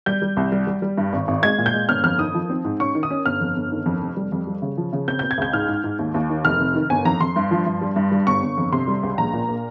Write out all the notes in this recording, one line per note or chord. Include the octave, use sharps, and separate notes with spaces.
G3 G6
G3
C2
G3
G3
G3
G2
G#1
G#1
G#3 G#6
A#2
G6
G#3
G1 F6
F2 F6
D#3 D#6
F3
C4
G#2
C#4 C#6
D#3
D#6
C#4
G1 F6
F2
G1
D#3
F2
F1
G3
F2
G3
C#3
F3
C#3
C4 G6
C4 G6
G#6
C#2 G6
G#2 F6
G#2
G#2
D#2
D#2
D#3
F1 F6
C3
D#3
G1 G#5
F2 A#5
F2 C6
G2
F3
G2
G3
G2
G3
G1 C#6
G1
F2
C3 C6
G3
C#2
A#1 A#5
A#2
A#3